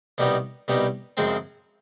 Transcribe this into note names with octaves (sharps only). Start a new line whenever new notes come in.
C2 B2 G3 B3 D#4
C2 B2 G3 B3 D#4
F#2 C#3 F3 G#3 C4